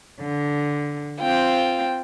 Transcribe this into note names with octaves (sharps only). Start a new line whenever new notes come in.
D3
C4 F4 G5